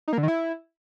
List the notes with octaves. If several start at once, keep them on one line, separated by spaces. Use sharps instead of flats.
D#4
A#3
D3
D#3
E4